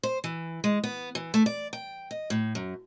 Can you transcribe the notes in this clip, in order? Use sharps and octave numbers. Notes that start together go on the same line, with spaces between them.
C5
E3
G#3
B3
E3
A3
D5
G5
D#5
A2
F#2